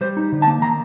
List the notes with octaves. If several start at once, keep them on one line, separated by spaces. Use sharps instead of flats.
G3 C5
D#4
D3
A5
A#3
D#3 A#5